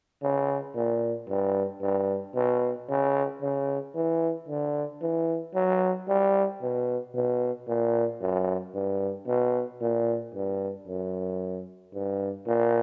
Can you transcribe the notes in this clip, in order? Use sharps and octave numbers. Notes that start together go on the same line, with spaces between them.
C#3
A#2
G2
G2
B2
C#3
C#3
E3
D3
E3
F#3
G3
B2
B2
A#2
F#2
G2
B2
A#2
G2
F#2
G2
A#2